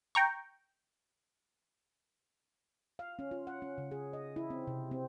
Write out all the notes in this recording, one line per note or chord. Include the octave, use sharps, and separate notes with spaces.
G5 A#5 C#6
F5
C#4
F4
F#5
C#4
C#3
G#4
D#5
E4
C4
C3
C4